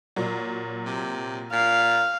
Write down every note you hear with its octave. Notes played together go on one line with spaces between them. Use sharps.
A#2 F#3
C3
A#2 F5